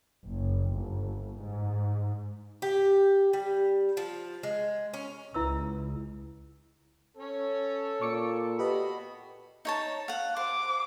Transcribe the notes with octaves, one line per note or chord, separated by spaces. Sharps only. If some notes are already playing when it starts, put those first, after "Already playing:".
F#1
G1
G#2
G4
G3
F3
G#3
C#4
C#2 E4 B4 E6
C#4 A4 C#5
A#2 C#6 D6 C#7
F#4 G4 B4 D#5 B5
D#4 C#5 A5
F5 F#5
C5 D6